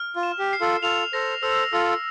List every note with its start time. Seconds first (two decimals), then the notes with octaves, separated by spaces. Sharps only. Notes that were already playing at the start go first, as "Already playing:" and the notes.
Already playing: F6
0.16 F4
0.23 E7
0.39 G4
0.53 C7
0.61 F4 A4
0.83 F4 A4 F7
1.13 A4 C5 A#6
1.43 A4 C5 E6
1.73 F4 A4 E6